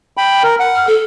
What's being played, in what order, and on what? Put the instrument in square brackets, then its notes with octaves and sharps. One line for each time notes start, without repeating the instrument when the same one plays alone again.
[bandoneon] G5 B5
A#4
F#5
[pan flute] F6
A4